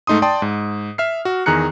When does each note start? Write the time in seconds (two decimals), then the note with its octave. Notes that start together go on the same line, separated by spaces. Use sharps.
0.07 G#2 A3 D#4 C6 D#6
0.22 D5 G5 A5 C6 D#6
0.42 G#2
0.98 E5 F6 C7
1.25 F#4
1.46 E2 D#3 G#4 A#5 F#6 C#7